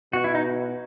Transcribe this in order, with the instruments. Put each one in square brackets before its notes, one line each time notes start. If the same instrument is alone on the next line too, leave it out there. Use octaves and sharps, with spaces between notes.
[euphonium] B2 [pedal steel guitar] F#4
[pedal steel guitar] E4
D#4